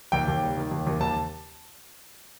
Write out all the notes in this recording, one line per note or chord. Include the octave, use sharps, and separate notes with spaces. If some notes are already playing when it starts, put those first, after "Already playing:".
D#2 G5
D#2
G3
D#3
D#2
D#2
D#2 A5